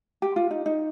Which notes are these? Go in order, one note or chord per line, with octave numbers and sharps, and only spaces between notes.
G4
F4
D#4
D#4